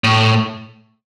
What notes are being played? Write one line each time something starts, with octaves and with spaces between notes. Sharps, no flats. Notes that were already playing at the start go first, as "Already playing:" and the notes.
A2